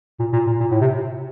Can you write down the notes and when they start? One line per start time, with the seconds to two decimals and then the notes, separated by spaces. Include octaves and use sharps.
0.20 A#2
0.33 A#2
0.47 A#2
0.60 A#2
0.71 A2
0.81 C3